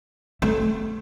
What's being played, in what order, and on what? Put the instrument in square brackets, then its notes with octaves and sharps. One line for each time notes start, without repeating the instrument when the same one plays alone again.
[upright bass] A3